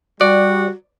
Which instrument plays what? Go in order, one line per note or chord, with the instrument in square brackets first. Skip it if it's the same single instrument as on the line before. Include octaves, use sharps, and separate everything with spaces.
[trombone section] G3 [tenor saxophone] F#4 [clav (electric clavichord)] D5